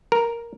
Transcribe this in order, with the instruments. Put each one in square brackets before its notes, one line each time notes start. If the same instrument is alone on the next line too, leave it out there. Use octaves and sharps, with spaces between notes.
[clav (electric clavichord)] A#4